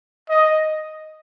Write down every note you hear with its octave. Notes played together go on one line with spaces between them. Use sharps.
D#5